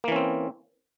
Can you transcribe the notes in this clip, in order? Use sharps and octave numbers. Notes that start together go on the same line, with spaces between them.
E3 A#3 C4 C#4